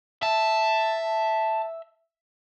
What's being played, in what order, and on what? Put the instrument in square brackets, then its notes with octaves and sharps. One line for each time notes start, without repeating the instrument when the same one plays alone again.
[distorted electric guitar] E5 [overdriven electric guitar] A5